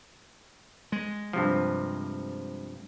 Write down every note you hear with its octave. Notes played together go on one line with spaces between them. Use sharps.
G#3
G2 C3 F3